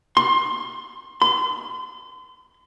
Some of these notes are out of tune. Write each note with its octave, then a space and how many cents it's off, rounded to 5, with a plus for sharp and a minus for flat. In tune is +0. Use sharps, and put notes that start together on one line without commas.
C6 +25
C6 -40